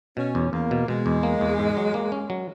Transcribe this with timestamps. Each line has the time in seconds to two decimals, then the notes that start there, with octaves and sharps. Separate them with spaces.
0.17 B2 C#4
0.35 E2
0.53 E2 A#3
0.71 B2
0.88 B2 G#3
1.06 E2
1.23 A#3
1.41 E2
1.59 G#2
1.77 F#3
1.94 A#3
2.12 C#4
2.30 F#3